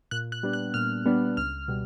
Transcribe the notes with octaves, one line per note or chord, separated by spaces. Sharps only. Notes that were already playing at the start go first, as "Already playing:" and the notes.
A#2 F#6
F#6
G3 B3 D4
F#6
A#2 F6
G3 B3 D4
C#2 F6
B2 G3